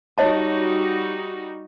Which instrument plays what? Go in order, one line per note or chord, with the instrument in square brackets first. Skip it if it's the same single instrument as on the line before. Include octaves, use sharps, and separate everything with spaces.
[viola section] G3 D#4 F#4 [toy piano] C#5 D#5 A5